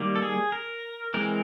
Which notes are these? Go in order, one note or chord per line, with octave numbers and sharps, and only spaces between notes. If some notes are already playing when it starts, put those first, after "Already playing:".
Already playing: D#3 G3 A#3
A4
G#4
A#4
E3 G#3 C4 A#4